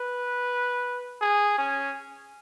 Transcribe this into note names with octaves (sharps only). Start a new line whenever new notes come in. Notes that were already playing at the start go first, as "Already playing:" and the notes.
Already playing: B4
G#4
C#4